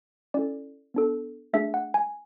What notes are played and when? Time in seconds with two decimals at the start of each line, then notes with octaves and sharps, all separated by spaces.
0.34 C#4 E4 A4 D5
0.94 B3 D4 A4
1.53 A3 D4 G#4 E5
1.74 F#5
1.94 G#5